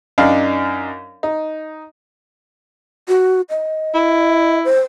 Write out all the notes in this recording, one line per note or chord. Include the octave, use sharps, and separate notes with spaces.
F#2 D4 D#4 F5
D#4
F#4
D#5
E4
C5